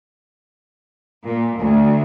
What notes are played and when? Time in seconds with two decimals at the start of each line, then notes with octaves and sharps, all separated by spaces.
1.24 A#2
1.58 D2